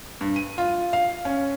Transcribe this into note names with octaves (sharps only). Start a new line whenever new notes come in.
G2
D#7
F4
F5
C#4